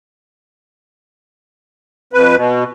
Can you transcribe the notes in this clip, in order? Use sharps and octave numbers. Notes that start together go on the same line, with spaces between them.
F2 B4
B2